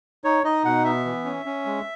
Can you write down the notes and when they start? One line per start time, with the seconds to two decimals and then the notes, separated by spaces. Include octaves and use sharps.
0.24 D#4 C#5
0.44 D#4 D#5
0.65 B2 F#5
0.84 B3 E5
1.05 E3
1.25 C#4
1.46 C#4
1.66 G#3